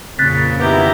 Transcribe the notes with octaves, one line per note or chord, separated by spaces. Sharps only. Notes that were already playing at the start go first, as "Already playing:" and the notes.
F2 A#2 C#3 F#6 A6 B6
D#3 B3 E4 G4 A#5